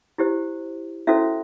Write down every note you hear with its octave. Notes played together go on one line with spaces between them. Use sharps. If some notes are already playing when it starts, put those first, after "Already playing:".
E4 G4 C5
C#4 E4 F#4 A4 C5 E5